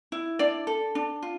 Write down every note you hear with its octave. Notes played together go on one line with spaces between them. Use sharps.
E4
D4 D5
A4
D4
F4